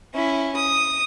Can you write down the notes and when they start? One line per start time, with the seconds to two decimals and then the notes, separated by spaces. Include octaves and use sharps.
0.14 C#4 E4
0.56 D#6